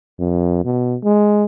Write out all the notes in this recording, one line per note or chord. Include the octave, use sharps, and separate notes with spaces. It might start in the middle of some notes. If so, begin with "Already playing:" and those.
F2
B2
G#3